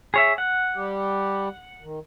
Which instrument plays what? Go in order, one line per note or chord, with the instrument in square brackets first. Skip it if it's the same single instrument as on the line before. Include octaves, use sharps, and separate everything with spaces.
[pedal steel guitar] G#4 C#5 E5
F#5
[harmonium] G3 G4
D#3